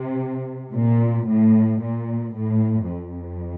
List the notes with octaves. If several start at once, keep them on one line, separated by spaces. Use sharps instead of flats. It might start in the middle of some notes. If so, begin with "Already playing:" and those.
Already playing: C3
A#2
A2
A#2
A2
F2